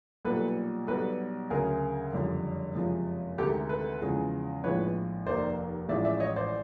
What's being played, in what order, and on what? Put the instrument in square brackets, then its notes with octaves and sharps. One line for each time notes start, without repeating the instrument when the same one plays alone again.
[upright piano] B1 A#2 G3 A4 B4
B1 B2 G3 A4 B4
D2 C#3 F#3 G#4 A#4
F#1 F2 D3 G3
F#1 F2 C3 F3 G#3
D2 C3 D#3 G#3 G4 A4
A4 B4
E2 C#3 F3 G#3
A#1 A2 F3 G#3 B4 C#5
F1 D#2 D#3 C5 D5
A1 A2 F3 G#3 D5 E5
D5 E5
C#5 D#5
C5 D5